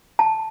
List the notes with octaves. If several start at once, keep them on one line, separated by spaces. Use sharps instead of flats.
A5